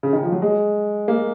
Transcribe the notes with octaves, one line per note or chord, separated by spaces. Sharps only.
C#3
D#3
F3
F#3
G#3
A#3